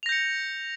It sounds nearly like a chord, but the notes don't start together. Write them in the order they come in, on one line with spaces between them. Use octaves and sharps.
F7 A#6 G6 C#7